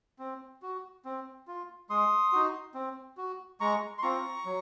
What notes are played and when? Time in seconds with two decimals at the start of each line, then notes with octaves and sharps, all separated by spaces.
0.19 C4
0.62 F#4
1.05 C4
1.47 F4
1.90 G#3 C6 D#6
2.32 D#4 F#4
2.74 C4
3.17 F#4
3.60 G#3 A#5 C#6
3.98 C6
4.02 C4 F4 A#5 C#6
4.45 F#3